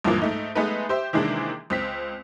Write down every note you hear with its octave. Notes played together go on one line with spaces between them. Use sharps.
C#2 G2 A#2 E3 F3 A#3
G#2 A3 D#4
G#3 A3 B3 D#4 B4
G4 C5 E5
C3 D#3 E3 G#3 A#3 D4
C#2 C4 B6